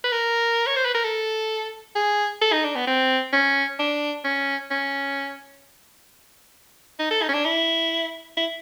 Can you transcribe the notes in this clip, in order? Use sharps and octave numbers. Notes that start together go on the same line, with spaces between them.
B4
A#4
C#5
C5
B4
A#4
A4
G#4
A4
D#4
D4
B3
C4
C#4
D4
C#4
C#4
D#4
A4
D#4
C#4
D4
E4
E4